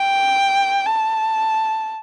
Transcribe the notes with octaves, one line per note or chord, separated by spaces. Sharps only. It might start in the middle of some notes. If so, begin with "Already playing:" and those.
Already playing: G5
A5